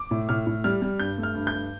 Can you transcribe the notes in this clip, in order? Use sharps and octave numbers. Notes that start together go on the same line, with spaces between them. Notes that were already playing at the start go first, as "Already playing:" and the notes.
Already playing: D6
A2
A2 F6
A2
G3 F6
G3
G2 G6
A3
F6
G2
G6
G2